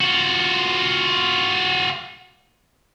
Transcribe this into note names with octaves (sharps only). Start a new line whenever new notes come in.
F4 F#4